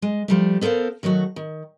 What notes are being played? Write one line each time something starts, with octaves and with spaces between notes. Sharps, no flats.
G#3
F3 G3 A3
B3 A4 A#4 C5 F5
D#3 F#3 A3 F#4
D#3